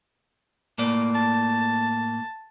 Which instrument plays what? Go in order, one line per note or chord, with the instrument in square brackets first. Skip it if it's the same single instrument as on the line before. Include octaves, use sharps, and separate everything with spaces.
[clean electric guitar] A2 A#3 D5
[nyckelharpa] A5